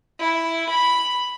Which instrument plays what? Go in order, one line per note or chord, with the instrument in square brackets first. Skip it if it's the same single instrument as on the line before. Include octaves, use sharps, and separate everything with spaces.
[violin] E4
B5